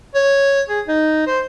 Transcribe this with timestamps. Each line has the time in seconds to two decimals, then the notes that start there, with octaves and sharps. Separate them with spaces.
0.15 C#5
0.69 G#4
0.88 D#4
1.27 C5